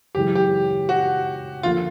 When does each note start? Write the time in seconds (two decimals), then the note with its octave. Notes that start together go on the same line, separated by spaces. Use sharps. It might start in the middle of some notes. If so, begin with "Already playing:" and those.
0.15 F#2 C#3 E3 G#3 G4
0.35 G4
0.89 F#4
1.63 D3 F3 A#3 F4